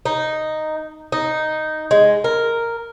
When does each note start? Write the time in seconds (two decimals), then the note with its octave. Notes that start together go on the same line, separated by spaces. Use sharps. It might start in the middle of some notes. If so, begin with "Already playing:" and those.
0.06 D#4
1.12 D#4
1.91 G#3
2.24 A#4